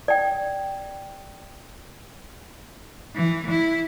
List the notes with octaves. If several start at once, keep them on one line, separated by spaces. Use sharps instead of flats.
D5 G5
E3
E4